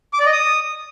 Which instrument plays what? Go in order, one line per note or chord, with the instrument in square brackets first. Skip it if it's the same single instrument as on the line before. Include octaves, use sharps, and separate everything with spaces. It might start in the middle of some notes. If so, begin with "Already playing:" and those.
[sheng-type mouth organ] D6
D5
D#5
D#6